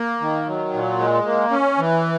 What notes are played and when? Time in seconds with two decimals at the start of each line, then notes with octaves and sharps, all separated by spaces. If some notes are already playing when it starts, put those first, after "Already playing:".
Already playing: A#3
0.21 D#3
0.47 F#3
0.73 A#2
0.99 G#3
1.26 A#3
1.51 C#4
1.78 E3